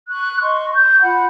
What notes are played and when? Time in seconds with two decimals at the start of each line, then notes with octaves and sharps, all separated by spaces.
0.08 C#6 F#6
0.41 D#5 C6 C#6
0.74 G6
1.02 F4 F#5 B5